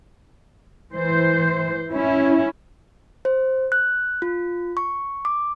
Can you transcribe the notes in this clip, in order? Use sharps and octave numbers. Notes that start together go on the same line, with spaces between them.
E3 C5
C#4 E4
C5
F#6
F4
C#6
D6